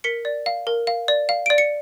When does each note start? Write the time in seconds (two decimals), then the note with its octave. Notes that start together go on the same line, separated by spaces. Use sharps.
0.04 A#4 B6 C#7
0.25 D5
0.46 F5
0.67 A#4
0.87 F5
1.08 D5
1.29 F5
1.46 D5 D7
1.58 C#7